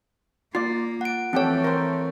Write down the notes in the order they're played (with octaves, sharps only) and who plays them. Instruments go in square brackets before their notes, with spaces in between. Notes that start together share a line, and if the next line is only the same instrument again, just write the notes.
[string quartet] A#3 [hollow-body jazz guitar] F4 D5 [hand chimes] C7
[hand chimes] F#5 D7
[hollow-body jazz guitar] F2 G4 A4 [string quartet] E3 A3 [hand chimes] C4 C#5
[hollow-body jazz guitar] A#4 C5